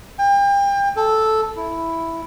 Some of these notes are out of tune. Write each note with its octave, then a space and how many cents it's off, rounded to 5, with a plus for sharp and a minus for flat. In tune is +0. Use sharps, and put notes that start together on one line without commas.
G5 +35
A4 -5
E4 +0